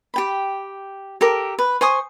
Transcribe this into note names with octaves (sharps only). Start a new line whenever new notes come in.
G4 G5 B5
G4 A4 A#4
B4
C5 G#5 C#6 D#6